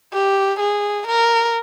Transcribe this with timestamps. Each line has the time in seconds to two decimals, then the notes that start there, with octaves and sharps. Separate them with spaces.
0.13 G4
0.59 G#4
1.07 A#4